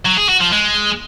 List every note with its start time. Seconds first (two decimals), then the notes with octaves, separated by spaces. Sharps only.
0.06 F#3
0.18 G#4
0.29 F#4
0.41 F3
0.53 G#3